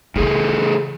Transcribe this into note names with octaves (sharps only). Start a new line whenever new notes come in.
A2 C#3 E3 G#4 A4